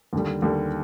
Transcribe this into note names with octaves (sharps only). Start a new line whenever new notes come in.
D#2 D3 G3
D#2 D3 G3